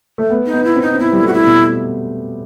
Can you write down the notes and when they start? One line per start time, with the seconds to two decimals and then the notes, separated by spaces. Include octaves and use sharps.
0.18 A3
0.30 B3
0.46 D#4
0.53 B3
0.64 E4
0.76 C4
0.82 D#4
0.94 C4
0.99 B3 E4
1.12 G3
1.21 A3
1.27 F#4
1.33 E4
1.46 B2